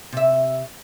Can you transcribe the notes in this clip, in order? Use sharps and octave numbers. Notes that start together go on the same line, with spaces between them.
C3 E5